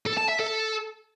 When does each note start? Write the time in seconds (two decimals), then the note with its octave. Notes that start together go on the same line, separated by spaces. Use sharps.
0.06 A4
0.18 A5
0.29 E5
0.40 A4